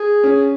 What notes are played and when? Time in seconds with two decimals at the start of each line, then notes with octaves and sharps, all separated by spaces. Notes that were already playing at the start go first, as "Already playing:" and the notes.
Already playing: G#4
0.23 C#4